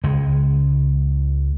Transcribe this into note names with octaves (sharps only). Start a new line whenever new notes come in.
C#2 G#3